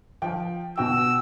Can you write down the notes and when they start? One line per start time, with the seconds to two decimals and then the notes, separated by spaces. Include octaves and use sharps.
0.22 F3 G5
0.78 B2 F#4 G5 E6